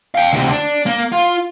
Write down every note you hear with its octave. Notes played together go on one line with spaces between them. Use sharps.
F5 G5
D2 C3
D4
A#3
F4